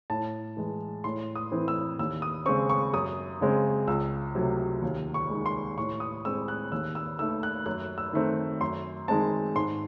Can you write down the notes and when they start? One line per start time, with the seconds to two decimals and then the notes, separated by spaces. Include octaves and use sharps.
0.10 A2 A5
0.57 E3 G#3
1.04 A2 C6
1.36 D#6
1.52 E3 A3 C4
1.68 E6
1.99 D#2 E6
2.22 D#6
2.46 C#3 G#3 C4 C#6
2.70 C#6
2.93 F#2 D#6
3.41 C#3 G#3 C4
3.87 C#2 E6
4.35 C3 F#3 A3
4.82 D#2
5.14 C#6
5.30 D#3 G#3
5.46 C6
5.77 A2 C#6
6.00 D#6
6.25 G#3 C4 E6
6.48 F#6
6.72 D#2 E6
6.95 E6
7.19 D#3 A3 E6
7.43 F#6
7.66 F#2 F#6
7.98 E6
8.13 D#3 A3 C4
8.61 F#2 C6
9.08 D#3 G#3 C4 A5
9.55 G#2 C6